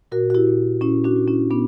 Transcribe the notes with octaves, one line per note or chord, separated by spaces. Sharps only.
A#2 F#4 A#4
F#4
E4 G4
A#2
A#2 C#4 E4
D4 F#4
A#2
C#4 E4
A#2 B3 D4